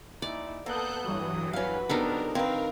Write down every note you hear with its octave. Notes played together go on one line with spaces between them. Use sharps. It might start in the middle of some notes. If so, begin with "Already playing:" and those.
A#2 D#4 E4 D5
A#3 B3 A4 D#6 F#6 G6
G2 E3 F#3 D#6
C#4 F#4 B4 F5
C3 F3 B3 D4 D#4 A4 A#4
D#3 C4 A#4 B4 F5